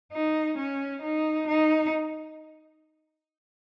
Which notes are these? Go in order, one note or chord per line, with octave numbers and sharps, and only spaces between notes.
D#4
C#4
D#4
D#4